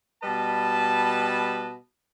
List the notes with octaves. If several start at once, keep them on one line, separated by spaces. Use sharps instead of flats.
B2 G3 B4 D#5 A5